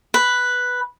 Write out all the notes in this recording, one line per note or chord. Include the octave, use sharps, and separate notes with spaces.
B4